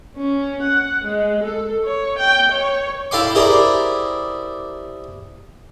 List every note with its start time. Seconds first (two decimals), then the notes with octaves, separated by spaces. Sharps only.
0.16 C#4
0.62 F#5
1.05 G#3
1.43 A4
1.84 C#5
2.19 G5
2.52 C#5
3.11 E4 A4 F5 G5 C6 D6
3.35 E4 G4 G#4 A#4 C5 D5